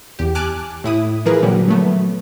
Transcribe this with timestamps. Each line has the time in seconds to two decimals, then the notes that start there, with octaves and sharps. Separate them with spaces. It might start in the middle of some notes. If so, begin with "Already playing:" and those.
0.19 E2 G4
0.35 G#5 A5 D6 F6 F#6
0.84 A2 E4 D#6
1.25 E3 F3 G#4 A#4 B4
1.42 A#2 D3 F#3 G3
1.69 F#3 A3 B3